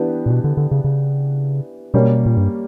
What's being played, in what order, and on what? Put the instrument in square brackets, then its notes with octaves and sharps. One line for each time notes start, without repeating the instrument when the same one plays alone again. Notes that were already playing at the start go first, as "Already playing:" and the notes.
Already playing: [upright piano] E3 B3 D4 G4 B4
[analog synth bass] A#2
B2
D3
D3
C#3
C#3
[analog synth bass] B2 [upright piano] G3 A#3 C#4 G4 C#5
[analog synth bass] A#2
G2